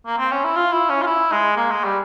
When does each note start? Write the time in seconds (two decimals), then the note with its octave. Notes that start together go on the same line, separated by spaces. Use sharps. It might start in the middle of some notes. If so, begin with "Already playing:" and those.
0.06 A#3
0.18 C4
0.31 C#4
0.44 E4
0.56 F4
0.73 E4
0.89 C#4
1.02 F4
1.06 E4
1.32 G#3
1.57 A#3
1.70 G#3
1.84 G3